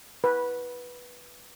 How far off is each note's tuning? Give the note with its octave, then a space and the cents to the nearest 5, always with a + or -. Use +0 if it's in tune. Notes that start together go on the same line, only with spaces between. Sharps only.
B4 -10